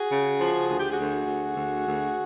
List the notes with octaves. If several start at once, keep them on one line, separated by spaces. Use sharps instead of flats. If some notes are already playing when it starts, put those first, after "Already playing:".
Already playing: F#4 G#4
C#3
F3
D2 G#4
G4
F#4 G#4
D2
D2
D2
D2